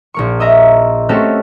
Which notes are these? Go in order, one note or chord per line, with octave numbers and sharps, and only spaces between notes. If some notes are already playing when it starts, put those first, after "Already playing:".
A#1 A#3 C#6
D#5 E5 A#5
A3 C4 C#4 F#4 G4 A4